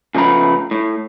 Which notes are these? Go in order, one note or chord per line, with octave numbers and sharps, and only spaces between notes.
C#3 F3 A3 B3 A#5 B5
A2